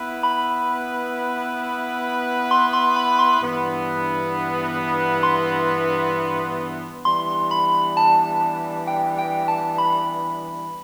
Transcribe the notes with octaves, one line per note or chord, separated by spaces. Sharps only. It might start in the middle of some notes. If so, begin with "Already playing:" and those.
Already playing: B3 E4 B4
B5
C6
C6
B5
C6
G2 E3 B3 D4
C6
E3 G3 B3 D4 C6
B5
A5
G5
G5
A5
B5